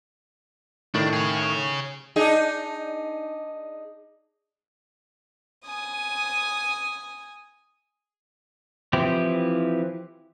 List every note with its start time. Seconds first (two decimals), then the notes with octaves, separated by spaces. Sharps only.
0.95 A2 D#3 D4
1.13 G#4 C#5
2.16 D4 D#4 G#4
5.65 G#5 D#6
8.93 E3 F3 C4 E4 G4